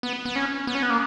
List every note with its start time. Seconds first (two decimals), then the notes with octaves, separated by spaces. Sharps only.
0.03 B3
0.26 B3
0.36 C#4
0.67 B3
0.75 C#4
0.83 B3
0.90 A#3